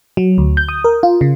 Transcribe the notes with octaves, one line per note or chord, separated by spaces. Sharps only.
F#3
D2
G6
D#6
A#4
F4
C#3